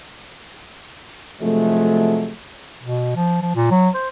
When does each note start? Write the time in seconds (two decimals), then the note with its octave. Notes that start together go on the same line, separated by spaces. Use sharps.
1.41 C3 F3 F#3 G#3 A3
2.83 B2
3.16 F3
3.42 F3
3.55 A#2
3.71 F#3
3.94 C5